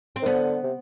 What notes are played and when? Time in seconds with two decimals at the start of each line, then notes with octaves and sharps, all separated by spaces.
0.16 C4
0.22 D#3
0.26 D3 B3
0.63 C3